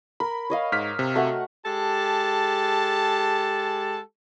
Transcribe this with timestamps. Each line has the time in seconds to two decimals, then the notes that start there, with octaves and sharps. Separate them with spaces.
0.20 A#4 B5
0.50 C#5 D#5 F5
0.72 G#2 F6 B6
0.99 C3
1.15 A3 F#4 F#5
1.65 G#3 G4 A4 A5